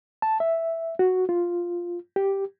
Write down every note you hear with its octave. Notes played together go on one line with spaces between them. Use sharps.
A5
E5
F#4
F4
G4